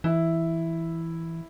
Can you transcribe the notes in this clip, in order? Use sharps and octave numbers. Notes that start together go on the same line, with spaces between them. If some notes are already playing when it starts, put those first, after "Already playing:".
E3 E4